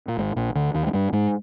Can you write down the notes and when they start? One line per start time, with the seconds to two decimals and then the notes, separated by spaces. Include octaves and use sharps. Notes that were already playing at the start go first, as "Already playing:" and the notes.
0.08 A#2
0.17 G#1 G#2
0.36 A#1 A#2
0.56 D2 D3
0.74 D#2 D#3
0.87 G#3
0.93 G2 G3
1.13 G#2 G#3